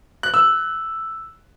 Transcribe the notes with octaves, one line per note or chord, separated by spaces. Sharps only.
F#6
E6